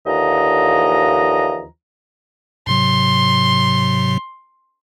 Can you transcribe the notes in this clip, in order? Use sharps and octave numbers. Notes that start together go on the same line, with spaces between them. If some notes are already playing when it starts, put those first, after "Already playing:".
D#2 D3 E3 F3 D#5 A#5
G#2 C3 F#3 C6